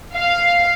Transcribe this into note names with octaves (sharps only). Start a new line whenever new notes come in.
F5